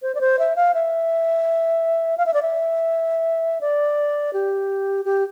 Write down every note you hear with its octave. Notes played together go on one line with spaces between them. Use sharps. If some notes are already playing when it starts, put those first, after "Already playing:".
C5
D5
C5
E5
F5
E5
F5
E5
D5
E5
D5
G4
G4